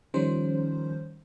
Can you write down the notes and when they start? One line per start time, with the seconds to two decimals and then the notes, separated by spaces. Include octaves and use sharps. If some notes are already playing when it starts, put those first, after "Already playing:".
0.14 D#3 F3 G3 C#4 D#4 C5